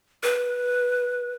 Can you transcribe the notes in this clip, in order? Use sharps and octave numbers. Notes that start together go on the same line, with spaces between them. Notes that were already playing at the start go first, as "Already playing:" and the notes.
B4